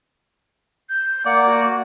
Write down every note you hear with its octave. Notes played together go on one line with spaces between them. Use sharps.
G6
A#3 D5 F#5
F#4